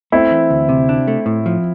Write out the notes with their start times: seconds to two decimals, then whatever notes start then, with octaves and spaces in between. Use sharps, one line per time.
0.12 A3 C4 E4
0.31 E3
0.50 D2
0.69 C3
0.89 D4
1.08 A3
1.26 A2
1.46 F3